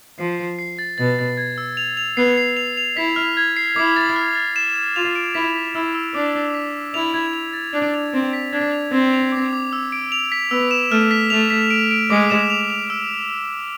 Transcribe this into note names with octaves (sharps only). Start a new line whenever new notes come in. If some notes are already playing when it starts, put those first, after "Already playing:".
F3 C7
C7
C7
A6
B2 A6
A6
G#6
E6
F7
F7
B3 C7
C7
F7
F7
E4 B6
F6
G#6
C7
E4 D6
A6
F6
A6
E7
E7
F4 F7
D7
E4 B6
B6
E4 E6
E6
D4 D6
D6
B6
D6
E4 F7
G#6
F7
A6
D4 F7
F7
C4 D7
B6
D4 G#6
F7
C4 G#6
F7
D6
D6
E6
D7
F7
B6
B3 E6
E7
A3 F6
B6
A3 F7
B6
D7
D7
G#3 D6
E7
F7
F7
E6